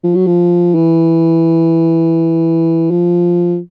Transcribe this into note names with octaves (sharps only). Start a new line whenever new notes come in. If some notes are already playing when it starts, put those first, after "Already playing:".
F3
F#3
F3
E3
F3